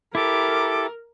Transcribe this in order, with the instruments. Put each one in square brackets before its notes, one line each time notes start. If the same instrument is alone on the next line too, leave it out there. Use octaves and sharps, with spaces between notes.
[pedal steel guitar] E4 G4 [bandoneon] A4 [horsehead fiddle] A#4 [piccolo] D6